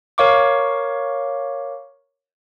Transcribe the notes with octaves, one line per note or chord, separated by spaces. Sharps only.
A#4 C#5 F5 C#6 D6